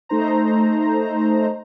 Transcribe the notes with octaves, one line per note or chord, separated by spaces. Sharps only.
A3 D#4 C5 A#5